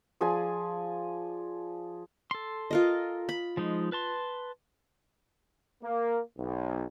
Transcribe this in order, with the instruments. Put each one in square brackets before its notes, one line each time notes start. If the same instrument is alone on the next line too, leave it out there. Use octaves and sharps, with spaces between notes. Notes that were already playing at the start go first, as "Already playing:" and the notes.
[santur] F3 G#4 D5 G#5
[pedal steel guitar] A4 C6
[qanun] F4 A#4 D#5
B5
[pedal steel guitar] F3 G#3 D#4
B4 A5 C6
[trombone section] A#3
B1